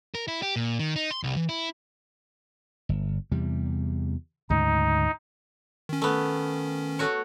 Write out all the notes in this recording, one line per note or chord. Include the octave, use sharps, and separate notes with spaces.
A#4
E4
G4
A#2
D#3
D#4
C6
C2
E3
E4
G1
E2 C3 G3
D2 G#2 C#3 D#4
D#3 C#4
A3 B3
A3 F#4 C#5